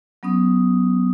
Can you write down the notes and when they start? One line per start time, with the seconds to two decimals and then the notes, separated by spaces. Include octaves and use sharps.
0.23 F#3 B3 C#4 D#6